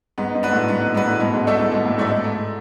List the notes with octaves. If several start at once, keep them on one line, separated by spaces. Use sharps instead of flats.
G#2 B3
G#2
D4 F#4 B4
A2
G#2 B3
G#2 D4 F#4 B4
A2
G#2 B2
G#2
G#2 A3 E4 A4 D5
G#2
G#2 B2
A2
G#2 A3 E4 A4 D5
G#2
A3